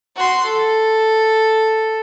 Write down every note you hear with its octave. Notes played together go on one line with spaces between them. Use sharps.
F#4 C6
A4